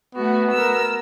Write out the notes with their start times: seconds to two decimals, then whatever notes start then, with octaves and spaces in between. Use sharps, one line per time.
0.15 A3 B3 F#4
0.51 A#4 E6